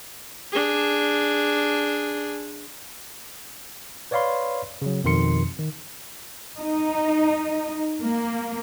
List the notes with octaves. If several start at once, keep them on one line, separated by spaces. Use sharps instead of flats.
D4 G#4
B4 C#5 D5 F5 B5 C6
C#3 F#3
F2 B2 D#3 C6 C#7
D#3
D#4
A#3